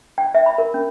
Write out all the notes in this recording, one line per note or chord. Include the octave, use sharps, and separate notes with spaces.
G5
E5
B5
A#4
C#4